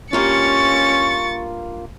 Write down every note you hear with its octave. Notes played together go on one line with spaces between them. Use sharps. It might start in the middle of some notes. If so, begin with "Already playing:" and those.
G2 A#3 C#4 F4 C#6 A6 C#7